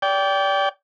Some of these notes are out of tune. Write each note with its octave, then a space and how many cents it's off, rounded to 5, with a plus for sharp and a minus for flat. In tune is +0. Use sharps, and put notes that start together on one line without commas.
D5 -30 G5 +0